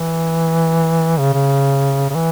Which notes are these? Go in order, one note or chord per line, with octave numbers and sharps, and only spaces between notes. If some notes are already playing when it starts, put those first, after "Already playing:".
Already playing: E3
C#3
C#3
C#3
E3